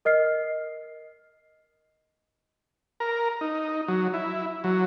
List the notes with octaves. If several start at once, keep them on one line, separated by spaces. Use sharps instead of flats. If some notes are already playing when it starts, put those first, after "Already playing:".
A#4 D#5 F6 C7
A#4
D#4
F#3
E4
F#3